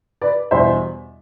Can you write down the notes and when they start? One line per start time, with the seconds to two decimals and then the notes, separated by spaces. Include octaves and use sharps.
0.22 B4 D5
0.51 E2 B2 G3 D4 C5 E5